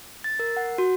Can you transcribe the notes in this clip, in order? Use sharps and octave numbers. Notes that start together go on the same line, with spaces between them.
A6
A#4
F#5
F#4